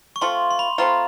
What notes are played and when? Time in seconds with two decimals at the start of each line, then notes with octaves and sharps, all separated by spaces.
0.16 C#6
0.21 A3 C4 F4 C6
0.51 C6
0.59 B5
0.78 A3 C4 F4 A#5